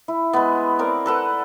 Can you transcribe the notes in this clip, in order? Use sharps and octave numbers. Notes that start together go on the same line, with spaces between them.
E4
G#3 B3
C4 A#4 D5
A4 B4 F#5